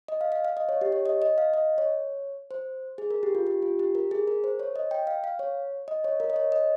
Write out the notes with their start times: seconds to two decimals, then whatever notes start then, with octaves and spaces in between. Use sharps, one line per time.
0.08 D#5
0.21 F5
0.32 F5
0.45 F5
0.57 D#5
0.69 C#5
0.81 G4
0.92 C#5
1.06 D#5
1.22 D#5
1.38 F5
1.54 D#5
1.78 C#5
2.51 C5
2.98 G#4
3.11 A#4
3.23 G4
3.35 F4
3.47 G4
3.62 F4
3.79 G4
3.95 A#4
4.11 G#4
4.27 A#4
4.44 C5
4.60 C#5
4.76 D#5
4.91 G5
5.07 F5
5.24 F5
5.39 C#5
5.88 D#5
6.04 C#5
6.20 A#4
6.30 D#5
6.36 C#5
6.52 D#5